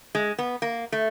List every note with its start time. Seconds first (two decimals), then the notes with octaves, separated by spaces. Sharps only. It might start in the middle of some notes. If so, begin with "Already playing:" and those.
0.15 G#3
0.39 B3
0.62 A#3
0.92 A3